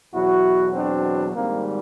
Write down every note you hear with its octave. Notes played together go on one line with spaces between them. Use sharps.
E2 B2 F#3 E4 F#4
C4 D4
G#1 G#2 D#3 G3 A#3 C4